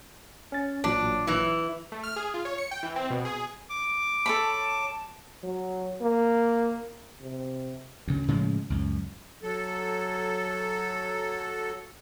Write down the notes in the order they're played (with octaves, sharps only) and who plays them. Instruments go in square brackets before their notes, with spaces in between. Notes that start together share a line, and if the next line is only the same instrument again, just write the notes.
[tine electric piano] C#4 A6
[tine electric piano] A1 A#2 F#3 [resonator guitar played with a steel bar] D4
[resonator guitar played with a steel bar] E3 E4
[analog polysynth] A3
F6
G#4
F4
C#5
C#7
G5
E3
C4
B2
G#4
[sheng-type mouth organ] D6
[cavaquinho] A4 C#5 B5 [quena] A5
[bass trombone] F#3
A#3
C3
[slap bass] D2 C#3
A2 C#3 F3 G#3
C#2 F#2
[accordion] F#3 A4